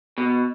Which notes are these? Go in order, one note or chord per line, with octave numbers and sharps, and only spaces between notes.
B2